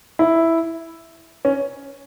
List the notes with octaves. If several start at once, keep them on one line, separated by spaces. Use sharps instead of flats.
E4
C#4